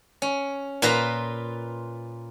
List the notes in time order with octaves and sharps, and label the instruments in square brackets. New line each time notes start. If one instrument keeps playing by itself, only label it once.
[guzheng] C#4
A#2 F4 B4 A#5 C6